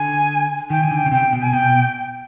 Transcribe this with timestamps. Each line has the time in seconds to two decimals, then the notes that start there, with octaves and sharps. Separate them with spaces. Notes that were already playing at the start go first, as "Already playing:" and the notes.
Already playing: D3 G#5
0.70 D#3 G5
0.84 G#5
0.91 D3
0.97 G5
1.06 C#3
1.11 C3 G5
1.33 B2
1.43 G#5
1.53 B2 G5